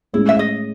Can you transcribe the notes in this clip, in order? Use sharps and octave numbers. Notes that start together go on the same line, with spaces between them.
A2 G#3 C#4 E4 G#4
E5
D#5